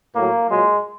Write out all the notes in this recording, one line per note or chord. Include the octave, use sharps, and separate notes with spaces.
A2 F#3 A#3
A#2 F#3 G#3